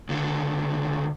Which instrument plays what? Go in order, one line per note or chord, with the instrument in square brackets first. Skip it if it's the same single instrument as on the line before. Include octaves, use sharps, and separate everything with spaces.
[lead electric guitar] C#2 D3